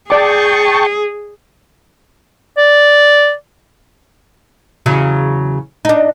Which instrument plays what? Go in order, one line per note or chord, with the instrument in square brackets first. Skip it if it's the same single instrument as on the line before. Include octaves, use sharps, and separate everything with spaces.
[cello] G#4 [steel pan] D5 D6 [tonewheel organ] G5 A5 C#6
[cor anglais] D5
[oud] E2 C#3 F#3
D4 D#4